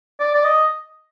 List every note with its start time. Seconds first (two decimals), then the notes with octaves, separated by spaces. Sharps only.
0.20 D5
0.35 D5
0.44 D#5